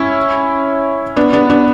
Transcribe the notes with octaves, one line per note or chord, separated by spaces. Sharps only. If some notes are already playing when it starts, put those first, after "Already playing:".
Already playing: C#4 E4
B3 D4
B3 D4
B3 D4